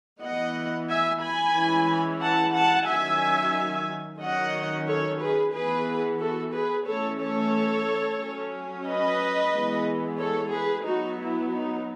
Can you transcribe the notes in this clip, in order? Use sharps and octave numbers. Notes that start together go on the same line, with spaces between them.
E3 B3 D#5 F#5
E5 G#5
G#5 B5
E3 G#3 C#4
F#5 A5
F#5 A5
D#3 F#3 C#4 E5 G#5
D#3 F#3 C#4 D#5 F#5
A4 C#5
G#4 B4
E3 B3 G#4 B4
F#4 A4
G#4 B4
E3 A3 C#4 A4 C#5
A4 C#5
F#3 C#4
B4 D#5
E3 G#3 B3
A4 C#5
G#4 B4
F#3 B3 D#4 F#4
E4
D#4